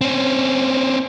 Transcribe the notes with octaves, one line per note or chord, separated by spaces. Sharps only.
C4 C#4